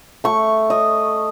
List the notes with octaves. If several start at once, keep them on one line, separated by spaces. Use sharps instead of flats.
A3 C#6
D#5